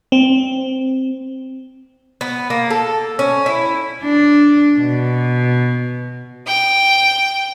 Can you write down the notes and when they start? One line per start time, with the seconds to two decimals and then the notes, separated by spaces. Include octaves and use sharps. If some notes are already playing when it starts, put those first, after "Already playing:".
0.12 C4
2.21 B3
2.50 A#3
2.70 A4
3.19 C#4
3.46 E4
4.03 D4
4.79 B2
6.47 G5